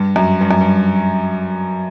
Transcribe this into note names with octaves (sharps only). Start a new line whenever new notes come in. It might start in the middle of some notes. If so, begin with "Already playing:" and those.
Already playing: G2
F#2
G2
F#2
G2